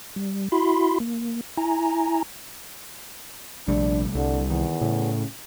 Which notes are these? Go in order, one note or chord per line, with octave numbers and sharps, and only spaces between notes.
G3
E4 F#4 B5 C6
A#3
E4 G#5 A#5
A#1 C3 G3 A3 D4
C2 D3
E2 D#3
A2 C#3